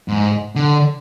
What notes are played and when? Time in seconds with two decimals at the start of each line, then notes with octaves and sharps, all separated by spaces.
0.08 G#2
0.55 D3